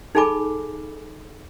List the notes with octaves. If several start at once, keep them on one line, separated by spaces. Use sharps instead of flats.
D#4 G#4 A4 G#5 B5 D6